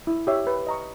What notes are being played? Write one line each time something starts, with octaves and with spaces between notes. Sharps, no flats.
E4
G4 C#5 E5
B4
D#5 A#5 C#6